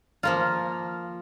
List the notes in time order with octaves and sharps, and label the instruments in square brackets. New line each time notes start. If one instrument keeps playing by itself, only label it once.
[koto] F3 A#3 F4